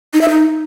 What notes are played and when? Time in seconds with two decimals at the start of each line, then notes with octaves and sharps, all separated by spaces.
0.13 D#4
0.21 E5
0.29 D#4